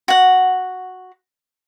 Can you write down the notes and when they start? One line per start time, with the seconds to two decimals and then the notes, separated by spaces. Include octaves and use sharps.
0.08 F#4 F#5